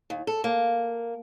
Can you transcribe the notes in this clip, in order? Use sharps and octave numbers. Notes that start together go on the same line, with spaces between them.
D#2
A4
A#3